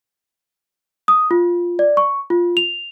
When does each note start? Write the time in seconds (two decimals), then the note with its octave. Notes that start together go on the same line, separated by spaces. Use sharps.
1.08 D#6
1.31 F4
1.79 D5
1.97 C#6
2.30 F4
2.57 F7